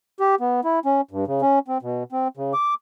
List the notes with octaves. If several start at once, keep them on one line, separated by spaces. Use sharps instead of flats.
G4
B3
E4
C#4
G2
C#3
C#4
C4
B2
C4
C#3
D6